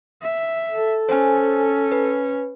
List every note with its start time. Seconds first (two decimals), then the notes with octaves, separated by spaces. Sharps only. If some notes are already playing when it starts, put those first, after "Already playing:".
0.22 E5
0.70 A4
1.09 C#4 C5 G#5
1.92 B4